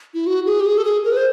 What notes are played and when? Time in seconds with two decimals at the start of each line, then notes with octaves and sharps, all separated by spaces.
0.14 E4
0.27 F#4
0.46 G#4
0.60 G4
0.66 G#4
0.78 A4
0.85 G#4
1.05 A#4
1.12 B4
1.17 C5